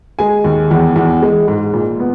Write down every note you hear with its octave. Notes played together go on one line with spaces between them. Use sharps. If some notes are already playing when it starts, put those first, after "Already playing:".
G#3 G#5
D#2
E2
E2
G#3
G#2
A#2
B3